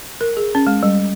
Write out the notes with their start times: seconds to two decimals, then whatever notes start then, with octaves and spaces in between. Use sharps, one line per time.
0.21 A#4
0.37 G#4
0.55 C#4
0.67 G#3
0.83 G3